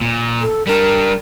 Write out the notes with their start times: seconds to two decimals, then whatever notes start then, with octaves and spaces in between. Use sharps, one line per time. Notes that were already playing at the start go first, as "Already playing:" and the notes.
0.01 A#2
0.41 A4
0.67 G3 D4 A#4